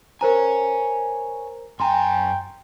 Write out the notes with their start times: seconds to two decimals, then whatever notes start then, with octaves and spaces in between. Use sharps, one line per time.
0.21 A#4 C5 C#5 G#5 A#5
1.80 F#2 G5 G#5 A#5 C6